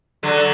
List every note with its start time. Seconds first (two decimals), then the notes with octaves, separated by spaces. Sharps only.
0.23 D3 F#3